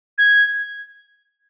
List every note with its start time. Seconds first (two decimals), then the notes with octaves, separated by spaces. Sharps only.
0.18 G#6